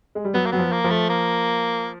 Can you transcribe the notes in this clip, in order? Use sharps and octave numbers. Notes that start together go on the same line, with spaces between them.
G#3
G3
F#3 B3
A#3
F#3 B3
F3
A#3
F3
A3
A#3